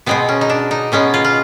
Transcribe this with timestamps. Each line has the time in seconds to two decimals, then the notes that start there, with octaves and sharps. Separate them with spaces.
0.06 B2 G#3 B3 C4
0.29 C#4
0.41 D#4
0.50 D4
0.71 D#4
0.92 B2 G#3 B3 C#4
1.14 F4
1.24 F4